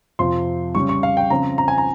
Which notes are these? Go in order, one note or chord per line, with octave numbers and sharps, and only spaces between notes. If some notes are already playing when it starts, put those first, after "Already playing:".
F2 C3 F3 C4 F4 C6
C#3 G3 C#4 C#6
C#6
F5
G5
C#3 F3 C4 F4 A#5
A#5
G#5
A#5